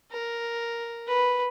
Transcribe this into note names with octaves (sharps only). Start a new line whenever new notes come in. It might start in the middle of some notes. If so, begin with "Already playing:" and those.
A#4
B4